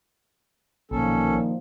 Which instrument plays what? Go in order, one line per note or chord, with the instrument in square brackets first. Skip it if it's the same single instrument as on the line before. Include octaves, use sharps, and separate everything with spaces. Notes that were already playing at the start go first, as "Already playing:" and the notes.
[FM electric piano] B1 [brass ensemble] A#2 D#3 F3 [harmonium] C#4 A4